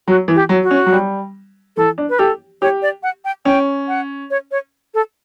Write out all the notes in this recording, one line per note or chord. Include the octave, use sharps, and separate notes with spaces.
F#3 F#4
E3
G4
F#3
F#4
C#4
F#3
G3
E3 A4
D4
B4
G4 A4
G4 C#5
D5
F#5
G5
C#4 G5
F#5
C#5
C#5
A4